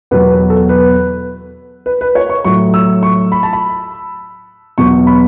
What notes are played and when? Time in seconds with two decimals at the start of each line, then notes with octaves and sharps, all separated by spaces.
0.11 E2 B2 F#3 B4
0.30 B4
0.50 A4
0.69 B4
1.86 B4
2.01 B4
2.15 C#5
2.30 C#6
2.45 A2 F#3 C#6
2.74 E6
3.03 C#6
3.32 B5
3.43 A5
3.53 B5
4.78 E2 B2 F#3 C#6
5.07 B5